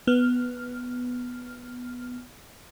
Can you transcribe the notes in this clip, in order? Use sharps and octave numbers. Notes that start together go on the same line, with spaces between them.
B3 F6